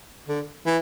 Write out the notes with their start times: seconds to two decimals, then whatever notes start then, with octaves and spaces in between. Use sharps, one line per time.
0.28 D3
0.66 E3